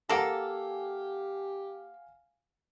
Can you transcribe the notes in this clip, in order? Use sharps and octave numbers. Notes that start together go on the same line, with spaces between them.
A#3 G4 A4 F5 F#5 G#5